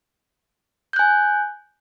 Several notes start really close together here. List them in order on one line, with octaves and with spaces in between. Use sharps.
G6 F#6 G#5